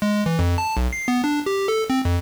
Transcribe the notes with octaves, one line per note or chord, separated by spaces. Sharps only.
G#3
E3
F2
A5
B1
C7
B3
D4
G4
A4
C4
F2